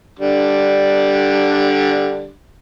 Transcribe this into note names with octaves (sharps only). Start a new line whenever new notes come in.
D3 G3 D4